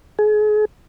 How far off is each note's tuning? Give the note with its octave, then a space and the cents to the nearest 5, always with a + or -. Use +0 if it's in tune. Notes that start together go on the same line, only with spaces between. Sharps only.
G#4 +35